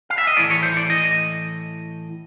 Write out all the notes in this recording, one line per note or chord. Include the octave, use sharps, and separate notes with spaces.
F5
E5
D#5
A2 E3 D5
C#5
C5
D5
D#5